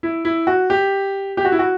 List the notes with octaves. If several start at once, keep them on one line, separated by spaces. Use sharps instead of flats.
E4
E4
F#4
G4
G4
F#4
E4
F#4